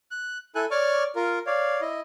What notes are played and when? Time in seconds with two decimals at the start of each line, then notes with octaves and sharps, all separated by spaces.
0.11 F#6
0.55 E4 A4 G#5 F#6
0.71 C#5 D5 C#6 D6 F6
1.16 F4 A#4
1.47 C#5 D5 F5
1.81 E4 D#5